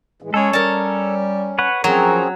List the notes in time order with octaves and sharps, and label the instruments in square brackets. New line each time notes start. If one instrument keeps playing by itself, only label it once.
[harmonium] A2 E3 G#3
[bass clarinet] G#3 [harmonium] C#4 [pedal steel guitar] A4 C#5
[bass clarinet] G3 [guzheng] A#4 A5
[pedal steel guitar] B4 C#5 F#5
[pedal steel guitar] F3 C#5 [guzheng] F#3 [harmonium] C4 C#4 G#4 [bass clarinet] A#4